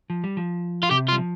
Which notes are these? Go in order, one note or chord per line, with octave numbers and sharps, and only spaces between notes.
F3
G3
F3
F4
C3 G4
F4
G3
F3